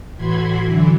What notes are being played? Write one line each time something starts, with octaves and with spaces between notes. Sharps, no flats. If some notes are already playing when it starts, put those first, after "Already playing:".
A2 E3 F#4 B5 C6 G#6
D3 E3 F#3 E4